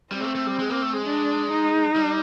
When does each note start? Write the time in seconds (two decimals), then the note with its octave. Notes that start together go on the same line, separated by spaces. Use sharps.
0.12 G3 C4
0.20 G#3
0.24 A3
0.35 A3
0.47 G3
0.59 G#3
0.70 A#3
0.82 A3
0.93 G#3
1.05 D4
1.51 D#4
1.96 G3